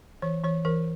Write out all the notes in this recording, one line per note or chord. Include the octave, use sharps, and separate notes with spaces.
E3 C#5
E3 C#5
E3 A#4